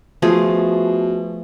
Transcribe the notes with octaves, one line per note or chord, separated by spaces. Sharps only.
B2 F3 A3 G#4